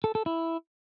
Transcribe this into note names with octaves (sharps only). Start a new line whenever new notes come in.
A4
A4
E4